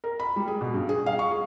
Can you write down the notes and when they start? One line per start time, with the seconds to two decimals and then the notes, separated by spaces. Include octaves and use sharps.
0.04 A#4
0.20 B5
0.36 G3
0.48 G#4
0.61 B2
0.74 G2
0.89 G#4
1.06 F5
1.19 C#6
1.31 G#4